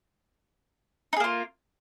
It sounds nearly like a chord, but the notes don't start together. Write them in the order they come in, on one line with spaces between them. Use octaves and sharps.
D#4 G#4 A#3 F4